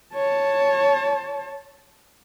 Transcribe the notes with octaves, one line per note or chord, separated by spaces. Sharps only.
C#5 A5